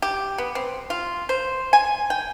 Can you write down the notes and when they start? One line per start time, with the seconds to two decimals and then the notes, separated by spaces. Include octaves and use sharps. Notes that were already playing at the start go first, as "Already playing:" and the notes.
0.02 G4
0.38 B3
0.55 C4
0.90 F4
1.29 C5
1.73 G#5
2.10 G5